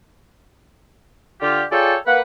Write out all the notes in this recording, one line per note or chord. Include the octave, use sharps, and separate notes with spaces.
D3 F4 G4
F4 G#4 A4 C#5 D5 G5
A#3 B4 F#5